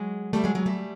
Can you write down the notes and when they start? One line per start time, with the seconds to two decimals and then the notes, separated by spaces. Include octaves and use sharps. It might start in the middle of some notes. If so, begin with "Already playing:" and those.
Already playing: F#3 G#3
0.33 G3 A3
0.44 F#3 G#3
0.55 F#3 G#3
0.66 G3 A3